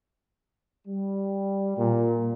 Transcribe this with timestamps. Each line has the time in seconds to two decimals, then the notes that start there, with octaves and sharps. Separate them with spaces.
0.86 G3
1.78 A#2